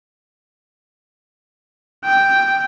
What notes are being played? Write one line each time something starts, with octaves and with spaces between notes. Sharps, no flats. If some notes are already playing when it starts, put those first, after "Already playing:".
G5